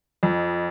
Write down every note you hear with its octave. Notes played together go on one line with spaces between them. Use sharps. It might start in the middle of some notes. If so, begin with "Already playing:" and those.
F2